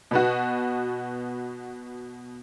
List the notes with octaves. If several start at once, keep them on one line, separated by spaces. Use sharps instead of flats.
B2 B3 F#4